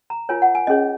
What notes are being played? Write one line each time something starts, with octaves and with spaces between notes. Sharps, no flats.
A#5
F4 A#4 C#5 G#5
F#5
G#5
C#4 G#4 C#5 D#5